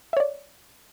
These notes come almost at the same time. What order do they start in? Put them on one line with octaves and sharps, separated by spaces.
E5 C#5 D5